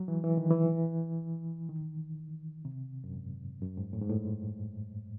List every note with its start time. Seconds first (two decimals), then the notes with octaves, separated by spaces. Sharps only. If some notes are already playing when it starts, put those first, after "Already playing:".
Already playing: F#3
0.08 E3
0.24 E3
0.37 D#3
0.51 E3
1.69 D#3
2.65 C3
3.04 F#2
3.13 G#2
3.61 F#2
3.77 G#2
3.93 A2
4.01 G#2
4.09 A2